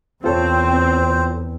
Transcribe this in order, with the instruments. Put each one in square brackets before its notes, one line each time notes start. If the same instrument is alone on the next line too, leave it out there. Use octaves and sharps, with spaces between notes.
[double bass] E2 [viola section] C4 [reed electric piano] F4 A4 C#5 [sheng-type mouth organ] C5